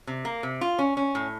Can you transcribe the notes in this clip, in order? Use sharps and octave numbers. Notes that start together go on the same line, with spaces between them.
C3
A#3
C3
F4
C#4
C#4
A2